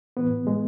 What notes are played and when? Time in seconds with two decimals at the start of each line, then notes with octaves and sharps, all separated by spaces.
0.17 A2 E3 B3
0.47 G#3